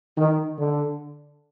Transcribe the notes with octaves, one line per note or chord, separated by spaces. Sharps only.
D#3
D3